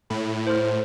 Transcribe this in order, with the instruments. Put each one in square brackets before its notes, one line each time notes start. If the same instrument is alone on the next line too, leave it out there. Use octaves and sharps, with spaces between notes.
[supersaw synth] A2 [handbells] B5
[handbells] C5 C6 F6